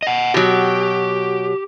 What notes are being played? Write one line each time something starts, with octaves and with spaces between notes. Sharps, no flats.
D#5 F#5
B2 F#3 G4